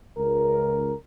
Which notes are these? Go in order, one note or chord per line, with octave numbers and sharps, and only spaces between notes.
C#2 A#4